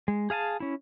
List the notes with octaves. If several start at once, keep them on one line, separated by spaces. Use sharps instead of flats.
G#3
G#4 F5 G#5 A5
C#4 E4